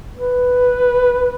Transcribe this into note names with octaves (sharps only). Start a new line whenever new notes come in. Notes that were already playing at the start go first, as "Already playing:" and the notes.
B4